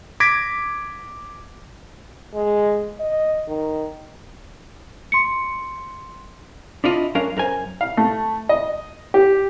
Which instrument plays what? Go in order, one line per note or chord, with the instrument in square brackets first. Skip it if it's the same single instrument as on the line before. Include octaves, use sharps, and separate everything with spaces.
[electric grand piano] D6 G#6 A#6 B6 D7
[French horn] G#3
D#5
D#3
[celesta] C6 C#7
[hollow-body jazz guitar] D4 E4 F4 D#5
F#2 C#4 D4 A#4 F5
F#2 A#4 C5 G#5
[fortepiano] F5
A3
D#5
G4